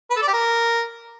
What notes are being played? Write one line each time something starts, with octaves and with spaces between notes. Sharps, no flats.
B4
A4
D5
G4
A#4